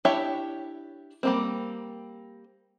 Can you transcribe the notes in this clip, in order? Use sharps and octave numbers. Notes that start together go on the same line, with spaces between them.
D4 E4 G4 C#5 E5
G3 A#3 C4